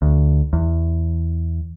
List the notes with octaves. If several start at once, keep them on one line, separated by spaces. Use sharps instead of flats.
D2
E2